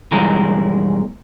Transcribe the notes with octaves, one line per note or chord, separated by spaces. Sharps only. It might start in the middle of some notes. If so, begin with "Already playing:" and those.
B1 G2 E3 G#3 A#4